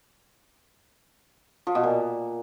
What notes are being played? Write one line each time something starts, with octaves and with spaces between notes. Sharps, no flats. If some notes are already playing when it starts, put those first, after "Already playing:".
F3
B2
A#2